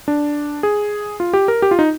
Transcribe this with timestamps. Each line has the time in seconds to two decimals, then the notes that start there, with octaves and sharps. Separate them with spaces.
0.08 D4
0.63 G#4
1.20 F4
1.33 G4
1.48 A#4
1.62 G4
1.71 F4
1.79 D#4